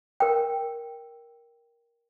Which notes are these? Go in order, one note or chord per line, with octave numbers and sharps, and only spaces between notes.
A#4 G5